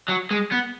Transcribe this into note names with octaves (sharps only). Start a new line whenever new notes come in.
F#3
G#3
B3